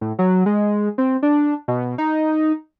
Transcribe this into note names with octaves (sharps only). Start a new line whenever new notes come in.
A2
F#3
G#3
C4
D4
B2
D#4